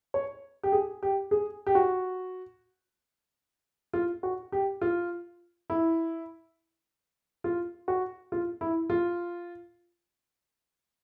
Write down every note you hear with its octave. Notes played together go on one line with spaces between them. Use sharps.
C#5
G4
G#4
G4
G#4
G4
F#4
F4
F#4
G4
F4
E4
F4
F#4
F4
E4
F4